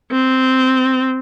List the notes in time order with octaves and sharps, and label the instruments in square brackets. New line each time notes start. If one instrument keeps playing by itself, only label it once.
[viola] C4